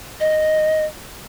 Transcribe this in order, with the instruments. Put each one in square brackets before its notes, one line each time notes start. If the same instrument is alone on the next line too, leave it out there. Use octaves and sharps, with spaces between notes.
[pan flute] D#5